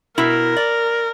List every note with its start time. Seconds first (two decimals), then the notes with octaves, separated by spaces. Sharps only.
0.18 B2 E4 A#4
0.57 D5